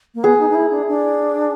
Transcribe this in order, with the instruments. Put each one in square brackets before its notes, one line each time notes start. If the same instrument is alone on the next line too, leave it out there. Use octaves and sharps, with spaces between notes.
[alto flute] A#3
[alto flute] B3 [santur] G#4
[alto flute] D#4
D#4
E4
D4
D4